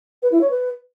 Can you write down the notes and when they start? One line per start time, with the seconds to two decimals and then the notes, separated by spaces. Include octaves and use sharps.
0.22 B4
0.32 E4
0.41 C#5
0.50 B4